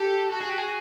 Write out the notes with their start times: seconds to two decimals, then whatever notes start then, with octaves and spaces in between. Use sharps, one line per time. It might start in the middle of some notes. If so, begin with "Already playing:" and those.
Already playing: G4 A4
0.31 F#4 A4
0.41 G#4
0.49 G4
0.58 G#4